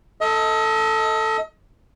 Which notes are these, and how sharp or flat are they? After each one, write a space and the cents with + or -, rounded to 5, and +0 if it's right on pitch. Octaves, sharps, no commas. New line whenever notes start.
A4 +5 D#5 +35